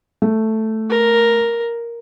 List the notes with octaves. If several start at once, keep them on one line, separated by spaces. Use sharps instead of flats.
A3
A#4